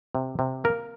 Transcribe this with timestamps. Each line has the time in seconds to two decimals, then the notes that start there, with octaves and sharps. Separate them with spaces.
0.15 C3
0.39 C3
0.64 A#3 A#4